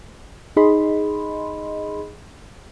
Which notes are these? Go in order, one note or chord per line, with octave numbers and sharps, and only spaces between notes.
D#4 G#4 D#5 B5 C6